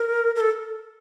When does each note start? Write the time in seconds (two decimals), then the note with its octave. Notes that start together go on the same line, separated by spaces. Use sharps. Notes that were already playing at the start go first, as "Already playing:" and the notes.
Already playing: A#4
0.35 A#4
0.40 A4